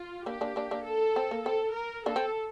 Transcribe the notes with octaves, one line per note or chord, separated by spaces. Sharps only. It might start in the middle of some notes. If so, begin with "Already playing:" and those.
Already playing: F4
A#3 D4 G4
A#3 D4
A#3 D4
A#3 D4
A4
C4
A#3
C4 A4
A#4
A#3 D4 A4
C4